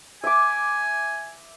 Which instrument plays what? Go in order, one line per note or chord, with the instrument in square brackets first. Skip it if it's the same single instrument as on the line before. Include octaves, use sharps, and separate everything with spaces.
[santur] E5 D6 [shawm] G#5